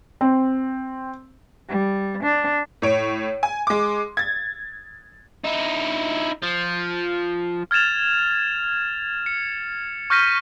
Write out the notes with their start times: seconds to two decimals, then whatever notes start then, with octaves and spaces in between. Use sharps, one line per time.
0.21 C4
1.68 G3
2.23 D4
2.82 A2 C#5 D7
3.43 G#5
3.67 G#3 D6
4.17 G#6 A6
5.45 D#4 E4
6.43 F3
7.71 F6 G#6 A6 E7 F7
9.26 C#7
10.10 C#6 F6 G6 A#6 B6 D#7